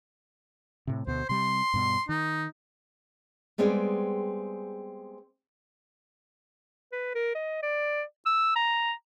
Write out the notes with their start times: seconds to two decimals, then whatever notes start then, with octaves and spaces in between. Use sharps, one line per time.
0.87 A2 C3
1.07 D2 B2 C5
1.29 C3 G3 C6
1.74 G2 B2
2.09 D#3 D#4
3.58 G3 G#3 B3 C4 G#4 D5
6.92 B4
7.15 A#4
7.35 D#5
7.62 D5
8.26 E6
8.56 A#5